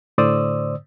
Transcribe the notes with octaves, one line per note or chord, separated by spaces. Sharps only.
A2 D3 C5 D5 D#6 E6